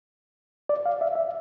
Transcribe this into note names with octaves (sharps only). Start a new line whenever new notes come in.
D5
F5
E5
E5